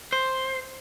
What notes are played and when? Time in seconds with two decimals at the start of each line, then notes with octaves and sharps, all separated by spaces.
0.12 C5